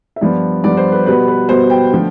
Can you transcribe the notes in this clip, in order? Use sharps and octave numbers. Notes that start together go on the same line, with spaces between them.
E5
G2 F3 B3 D5
G2 F3 B3 D5
C5
B4
B2 G3 B3 B4
B4
B2 G3 B3 C5
G5
D3 F3 A3